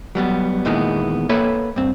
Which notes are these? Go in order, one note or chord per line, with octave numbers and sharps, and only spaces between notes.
F#3 G3 B3
E2 A#2 D#3 E3 G#3 B3
A#3 A4 B4 C#5 E5
G2 C4